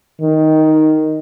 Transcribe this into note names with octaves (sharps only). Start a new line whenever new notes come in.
D#3